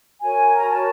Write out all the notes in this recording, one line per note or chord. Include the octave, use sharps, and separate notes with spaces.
F#4 A#4 C#5 G#5
A#5
A5